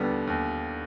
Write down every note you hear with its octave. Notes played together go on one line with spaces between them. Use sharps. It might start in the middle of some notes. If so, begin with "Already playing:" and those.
Already playing: D#2 D3 G3 B3
D#2